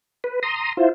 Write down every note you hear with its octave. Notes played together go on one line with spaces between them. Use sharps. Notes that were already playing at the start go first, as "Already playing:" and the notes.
B4
A#5 C6 D#6
E4 F4 C5